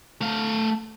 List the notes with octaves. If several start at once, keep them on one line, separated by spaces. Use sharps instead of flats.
A3 F5